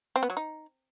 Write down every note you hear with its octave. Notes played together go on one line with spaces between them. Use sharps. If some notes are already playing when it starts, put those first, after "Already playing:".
C4
B3
F#3
D#4